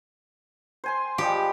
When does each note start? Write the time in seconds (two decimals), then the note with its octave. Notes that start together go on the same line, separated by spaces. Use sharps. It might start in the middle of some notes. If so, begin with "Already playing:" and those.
0.84 C5 G#5 C6
1.18 F3 G3 G#3 G4